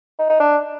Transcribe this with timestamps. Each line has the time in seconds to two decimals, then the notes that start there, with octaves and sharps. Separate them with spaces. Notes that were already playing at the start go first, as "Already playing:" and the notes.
0.19 D#4
0.30 D#4
0.40 D4